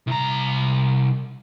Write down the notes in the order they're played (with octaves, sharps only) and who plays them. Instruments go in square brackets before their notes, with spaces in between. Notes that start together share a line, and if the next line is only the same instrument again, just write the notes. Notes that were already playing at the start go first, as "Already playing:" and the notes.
[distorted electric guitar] C2 A#5